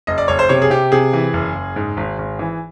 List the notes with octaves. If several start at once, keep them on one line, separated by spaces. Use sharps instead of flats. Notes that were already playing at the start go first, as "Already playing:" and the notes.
F#1 D#5
D5
F#1 C#5
C5
C3 C#5
G#4
C3 G4
C3 G#4
E3
F#1
F#1
G#2
G#1
G#1
E3